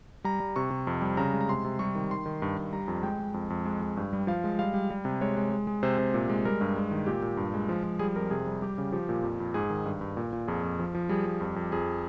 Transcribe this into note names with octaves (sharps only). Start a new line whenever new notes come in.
G3 A#5
G3
C3 C#6
C3
F2
G3
C#3 A#5
G#3
A#5
C3 C6
C3
G3 C#6
D#3
D#3 C6
D#3
G2
G2
G3 A#5
F2
G#3 G5
G#3
F2
F2
G#3
G#3
G2
G3
F3 F5
G#3
G3 F5
G3
G3
C3
G#3 C#5
G#3
G#3
G#3
C3 C5
C3
A#2
G#3
G3 A#4
G2
G#3
D#3
A#2 G4
A#2
G2
G#3
F3
F3
G3 G#4
F2 A#4
C3 G#4
G3
G3 G4
C#3
F3 G4
A#2
F2
F2
G#2 G#4
D#3
G2
G2
A#2
A#2
F2 G#4
F2
F3
F3
G3 G#4
G3
F2
F2
F2 G#4